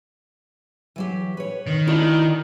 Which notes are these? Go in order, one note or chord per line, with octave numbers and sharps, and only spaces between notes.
E3 F#3 G4
B4 C#5
D#3
E4 A#4 D5 D#5